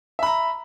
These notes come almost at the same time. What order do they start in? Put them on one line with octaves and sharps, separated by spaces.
E5 B5 A#5